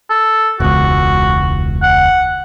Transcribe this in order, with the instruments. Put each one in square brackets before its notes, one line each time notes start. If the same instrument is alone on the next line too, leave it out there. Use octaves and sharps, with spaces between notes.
[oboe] A4
[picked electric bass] E1 C#2 [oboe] F#4
[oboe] F#5